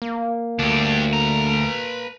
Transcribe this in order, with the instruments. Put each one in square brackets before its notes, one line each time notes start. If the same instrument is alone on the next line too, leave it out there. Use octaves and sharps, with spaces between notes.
[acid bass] A#3
[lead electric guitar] D2 [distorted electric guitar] D4 G4
[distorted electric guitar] B4 A#5